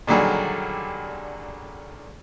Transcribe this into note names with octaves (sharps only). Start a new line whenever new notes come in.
A#2 D3 D#3 F#3 G3 G#4